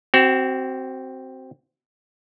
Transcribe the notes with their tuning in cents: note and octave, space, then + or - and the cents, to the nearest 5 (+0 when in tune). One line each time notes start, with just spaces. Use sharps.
C4 +0 F#4 +30